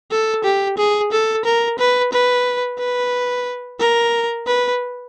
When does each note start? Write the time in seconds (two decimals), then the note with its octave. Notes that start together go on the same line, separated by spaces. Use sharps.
0.11 A4
0.44 G4
0.78 G#4
1.12 A4
1.45 A#4
1.79 B4
2.13 B4
2.79 B4
3.79 A#4
4.47 B4